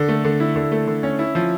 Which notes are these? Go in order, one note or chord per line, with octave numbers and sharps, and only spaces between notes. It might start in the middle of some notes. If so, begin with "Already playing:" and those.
Already playing: D3
A3
D3
E4
D3
A3
D3
C#4
E4
F3